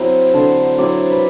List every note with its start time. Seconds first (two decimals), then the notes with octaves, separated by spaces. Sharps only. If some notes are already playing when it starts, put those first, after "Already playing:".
Already playing: F#3 C4 E4 C5
0.34 D3 C5
0.78 F#3 C4 E4 D5
1.11 B4